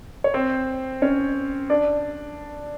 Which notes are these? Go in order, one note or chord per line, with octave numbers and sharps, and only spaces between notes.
C#5
C4 C5
C#4 C#5
D4 D5